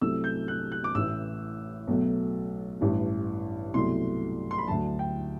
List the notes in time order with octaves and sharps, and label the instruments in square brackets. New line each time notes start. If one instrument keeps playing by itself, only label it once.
[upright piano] C2 C3 F#3 A3 E6
G6
F#6
F#6
D6
A1 A2 E3 E6
B1 B2 F#3 A3
A1 G2 E3
C2 B2 F#3 A3 C6
C6
B5
D2 D3 F#3 A5
G5